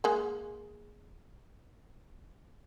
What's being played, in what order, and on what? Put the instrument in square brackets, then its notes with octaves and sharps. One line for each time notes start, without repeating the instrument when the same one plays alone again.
[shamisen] G#3 A#3